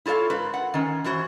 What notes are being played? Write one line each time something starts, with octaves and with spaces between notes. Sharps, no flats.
E4 F4 A4 C#5 F5
G#2 A#4 B4
F#5
D#3 C#4
F#2 E3 F#4 C5